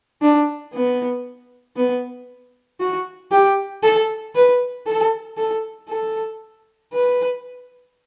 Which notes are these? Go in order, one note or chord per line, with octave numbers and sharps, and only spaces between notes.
D4
B3
B3
F#4
G4
A4
B4
A4
A4
A4
B4